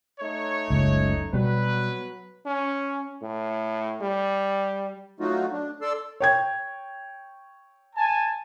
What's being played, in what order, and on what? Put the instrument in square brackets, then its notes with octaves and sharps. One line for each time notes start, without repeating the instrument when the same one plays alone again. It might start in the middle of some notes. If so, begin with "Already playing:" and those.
[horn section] A3 D#4 C#5
[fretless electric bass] F#1 C#2
[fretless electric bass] B2 G3 [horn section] F#3 B4
[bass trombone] C#4
A2
G3
[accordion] F#3 A3 D#4 F4 F#4
D4
A4 D5 C6 E6
[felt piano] C#5 G5 G#6
[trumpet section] G#5 A5